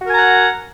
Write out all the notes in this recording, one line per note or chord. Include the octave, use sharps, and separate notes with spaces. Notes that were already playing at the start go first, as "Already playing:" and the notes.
F#4 A#4 F#5 G#5 A#5